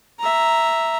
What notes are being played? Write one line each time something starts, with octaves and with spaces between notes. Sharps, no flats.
E5 A#5